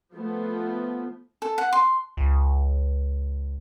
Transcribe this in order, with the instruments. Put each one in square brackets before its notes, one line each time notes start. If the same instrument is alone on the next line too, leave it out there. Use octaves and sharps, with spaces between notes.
[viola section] F3 A3 B3
[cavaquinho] A4
F#5
C6
[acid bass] C#2